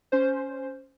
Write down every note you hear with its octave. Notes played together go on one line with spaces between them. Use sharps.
C#4 C5